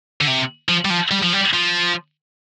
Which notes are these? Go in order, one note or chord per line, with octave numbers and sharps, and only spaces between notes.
D3
C3
F3
G3
F3
G3
F3
G3
F3